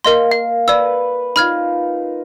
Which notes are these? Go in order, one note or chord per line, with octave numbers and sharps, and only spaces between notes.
A#3 A#4 D#5 C6
F5
B4 D5 E6
D#4 F4 B5 F6 G#6